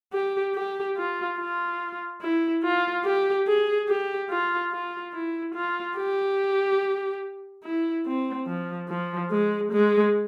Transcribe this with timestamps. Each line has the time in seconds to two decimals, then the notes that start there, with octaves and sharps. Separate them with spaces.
0.13 G4
0.55 G4
0.97 F4
1.38 F4
2.21 E4
2.63 F4
3.05 G4
3.47 G#4
3.89 G4
4.30 F4
4.72 F4
5.14 E4
5.55 F4
5.97 G4
7.64 E4
8.06 C4
8.47 F3
8.88 F3
9.31 G#3
9.72 G#3